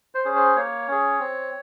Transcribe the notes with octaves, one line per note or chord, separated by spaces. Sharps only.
C5
C#4 G#4
C5
A#3 C#5
C#4 G#4
C4